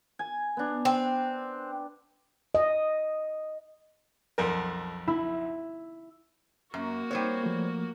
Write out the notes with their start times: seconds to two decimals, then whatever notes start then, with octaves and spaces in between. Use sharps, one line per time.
0.19 G#5
0.57 B3 D4
0.85 C4
2.55 D#5
4.38 B1 F2 A#4
5.07 E4
6.74 F#2 A#3 F#4 A#5
7.11 G3 C4 D#4 C5 C#5
7.44 F3 A3